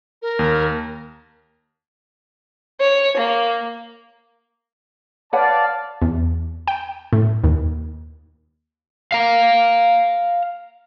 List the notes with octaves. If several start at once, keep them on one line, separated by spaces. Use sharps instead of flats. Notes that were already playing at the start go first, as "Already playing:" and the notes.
A#4
D#2
C#5
A#3
B4 C#5 D5 F5 F#5 A5
E2
G5
A2
D#2
F5 A#5